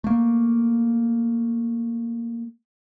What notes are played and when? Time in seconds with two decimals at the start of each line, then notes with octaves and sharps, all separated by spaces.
0.04 A3 A#3